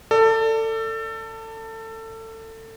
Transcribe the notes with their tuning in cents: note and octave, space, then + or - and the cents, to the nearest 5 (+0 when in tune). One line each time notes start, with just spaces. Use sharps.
A4 +25 D5 +0